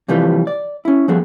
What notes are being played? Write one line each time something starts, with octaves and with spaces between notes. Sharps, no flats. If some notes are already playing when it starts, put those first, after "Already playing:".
C3 E3 F3 G3 A3 B4
D5
C#4 E4
F3 G3 B3 G#4 A4